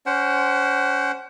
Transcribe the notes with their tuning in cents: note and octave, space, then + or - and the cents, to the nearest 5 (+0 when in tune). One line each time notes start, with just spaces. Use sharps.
C#4 +20 C5 +0 F#5 +30